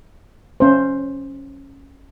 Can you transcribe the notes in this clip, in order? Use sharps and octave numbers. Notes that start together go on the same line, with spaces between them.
C#4 C5